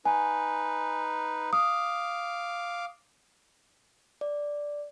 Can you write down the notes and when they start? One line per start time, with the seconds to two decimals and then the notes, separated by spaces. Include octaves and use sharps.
0.05 D#4 B4 G#5
1.53 F5 D6 D#6
4.21 D5